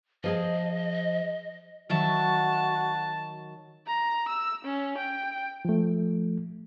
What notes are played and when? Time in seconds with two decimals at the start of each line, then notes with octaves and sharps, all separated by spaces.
0.24 F3 G#4 D#5 A5
1.90 D#3 F#3 F#4 E5 A5
3.87 A#5
4.29 E6
4.65 C#4
4.98 G5
5.65 F3 A3